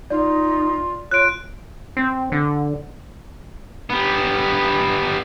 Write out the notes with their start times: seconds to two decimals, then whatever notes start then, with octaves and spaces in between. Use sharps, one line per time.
0.10 D#4 F4 D5
1.11 F4 C#5 F#6 D7
1.97 C4
2.32 D3
3.90 G3 B3